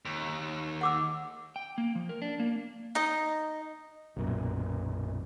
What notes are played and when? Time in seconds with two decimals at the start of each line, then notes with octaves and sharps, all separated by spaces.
0.05 D#2
0.81 F#5 D6 E6
1.56 G5
1.78 A#3
1.95 F3
2.09 A#4
2.22 D4
2.39 A#3
2.95 D#4 D#5
4.16 B1 F#2 A#2